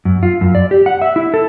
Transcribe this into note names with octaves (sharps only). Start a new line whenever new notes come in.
F#2
F4
F#2
D5
G4
F#5
E5
E4
A4